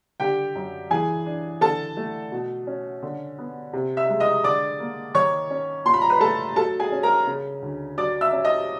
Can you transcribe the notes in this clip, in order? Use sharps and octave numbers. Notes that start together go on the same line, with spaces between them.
D3 G4 G5
F#2
E3 G#4 G#5
D4
D3 A4 A5
A3
B2
C#4
D3
B3
C3
E5 E6
G#3
D#5 D#6
D3 D5 D6
A#3
D#3 C#5 C#6
C#4
A#2 C6
B5
A#5
B4 B5
A3 A4 A5
F#3 A4 A5
G#4 G#5
C#4
A#4 A#5
C#3
D2
F#3 D5 D6
E5 E6
C#4
D#5 D#6